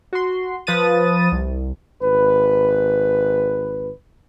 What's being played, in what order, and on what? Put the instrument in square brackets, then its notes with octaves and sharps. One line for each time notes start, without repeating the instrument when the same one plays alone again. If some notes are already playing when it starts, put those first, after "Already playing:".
[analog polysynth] F#4 C6
F3 B4 D#6 A6 D#7
C2
[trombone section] G#1 B4